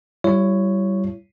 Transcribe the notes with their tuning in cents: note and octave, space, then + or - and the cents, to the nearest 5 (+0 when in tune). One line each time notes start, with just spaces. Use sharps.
G3 -20 E4 +35 C#5 +0